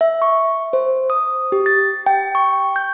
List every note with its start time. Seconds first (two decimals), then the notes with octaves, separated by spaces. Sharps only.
0.01 E5
0.22 C#6
0.73 C5
1.10 D#6
1.52 G4
1.66 A6
2.06 G5
2.35 C#6
2.76 G6